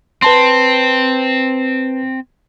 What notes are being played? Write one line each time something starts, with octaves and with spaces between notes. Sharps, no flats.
C4 B4 A5 C6